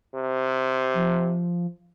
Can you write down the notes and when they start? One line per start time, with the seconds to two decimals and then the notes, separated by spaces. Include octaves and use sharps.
0.15 C3
0.94 F3